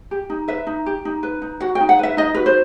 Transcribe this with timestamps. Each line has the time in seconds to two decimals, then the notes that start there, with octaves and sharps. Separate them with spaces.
0.11 G4
0.30 D#4
0.48 B4 E5
0.67 D#4
0.86 G4
1.05 D#4
1.23 B4
1.42 D#4
1.60 F#4 F#5
1.75 G5
1.80 D#4
1.89 F#5
1.99 B4 E5
2.17 D#4 D#5
2.34 F#4 B4
2.46 C5